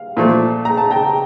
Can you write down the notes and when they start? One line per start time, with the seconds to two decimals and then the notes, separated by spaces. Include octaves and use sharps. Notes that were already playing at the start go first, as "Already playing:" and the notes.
Already playing: F5
0.17 A#2 F3 A3
0.65 A#5
0.77 A5
0.91 G5 A#5